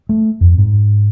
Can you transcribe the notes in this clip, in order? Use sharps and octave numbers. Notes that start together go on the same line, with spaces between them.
A3
F2
G#2